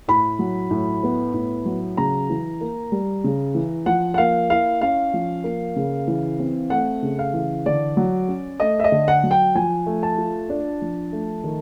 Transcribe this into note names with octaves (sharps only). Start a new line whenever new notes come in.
A2 B5
F#3
A2
B3
A2
F#3
C#3 A#5
E3
A#3
G3
C#3
E3
F3 F#5
F#5
A#3 F5
E4 F5
C#4 F5
F3
A#3
C#3
E3
C4
A3 F#5
C#3
F5
E3
D3 D5
F#3
C#4
A3 D#5
E5
D#5
D3
F#5
F#3
G5
F3 G#5
A3
A5
F4
D4
F3
A3
D#3